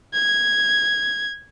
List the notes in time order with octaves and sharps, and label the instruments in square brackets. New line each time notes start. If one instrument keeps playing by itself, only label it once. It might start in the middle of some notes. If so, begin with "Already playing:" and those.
[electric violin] G#6